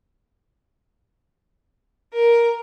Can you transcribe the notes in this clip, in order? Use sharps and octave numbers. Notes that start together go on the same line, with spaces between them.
A#4